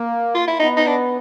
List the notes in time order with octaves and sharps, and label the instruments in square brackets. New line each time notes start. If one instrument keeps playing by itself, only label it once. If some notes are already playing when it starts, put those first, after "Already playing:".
Already playing: [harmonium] A#3
[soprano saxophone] F4
E4
[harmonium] B3 [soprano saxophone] D#4
[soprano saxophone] D#4
D4